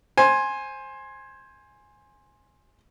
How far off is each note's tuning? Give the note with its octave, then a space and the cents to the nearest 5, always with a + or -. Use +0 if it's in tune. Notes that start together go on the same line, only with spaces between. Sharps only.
C5 +20 G#5 +0